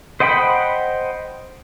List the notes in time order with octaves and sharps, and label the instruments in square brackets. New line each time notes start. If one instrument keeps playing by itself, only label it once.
[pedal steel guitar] C5 D#5 F#5 G5 B5